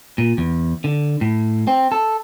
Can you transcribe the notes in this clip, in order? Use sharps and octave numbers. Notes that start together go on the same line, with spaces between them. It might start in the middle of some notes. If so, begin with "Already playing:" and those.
A#2
E2
D3
A2
C4
A4